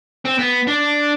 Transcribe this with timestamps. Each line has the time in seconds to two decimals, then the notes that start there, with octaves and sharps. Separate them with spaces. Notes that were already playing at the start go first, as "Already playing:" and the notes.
0.25 C4
0.39 B3
0.67 D4